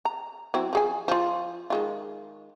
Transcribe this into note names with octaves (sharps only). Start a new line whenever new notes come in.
A#5
F#3 C4 E4
F3 G#4 G#5
F3 F4
D#3 G#3 F4